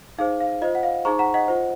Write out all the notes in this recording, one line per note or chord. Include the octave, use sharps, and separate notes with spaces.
D#4 G#4 C5 F5
F5
F4 C5 D#5
F#5
F5
D#4 G#4 C5 A#5 C#6
F#5 A#5
D#5 F#5
F4 C5